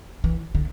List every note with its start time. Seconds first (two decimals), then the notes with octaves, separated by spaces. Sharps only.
0.24 E3
0.55 D3